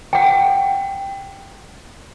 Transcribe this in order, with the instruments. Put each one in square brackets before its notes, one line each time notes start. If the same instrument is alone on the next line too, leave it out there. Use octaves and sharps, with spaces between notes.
[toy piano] F#5 G5